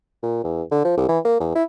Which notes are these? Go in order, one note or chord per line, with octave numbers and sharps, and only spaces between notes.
A#2
E2
D3
F3
C2
E3
A#3
E2
E4